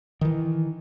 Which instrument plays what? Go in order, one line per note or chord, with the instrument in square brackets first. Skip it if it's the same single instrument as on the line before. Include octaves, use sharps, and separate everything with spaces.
[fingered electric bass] D#3 E3